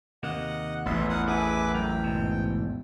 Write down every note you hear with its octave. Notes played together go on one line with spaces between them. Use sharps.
D#2 C3 A#3 D#5 F#5
A1 E2 B3 E5 C6
A#4 F#5 D#6
G#4 B4 E5 F#5 G#5 D6
F#3 A#4 G5
G#2 B2